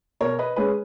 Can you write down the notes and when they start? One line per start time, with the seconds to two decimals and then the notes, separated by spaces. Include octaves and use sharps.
0.20 B2 A#4 C#5
0.39 B4 D#5
0.56 G#3 C#4 G#4 B4